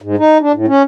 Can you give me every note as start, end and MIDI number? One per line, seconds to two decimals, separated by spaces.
0.02 0.16 44
0.18 0.38 63
0.41 0.52 62
0.53 0.66 45
0.68 0.82 61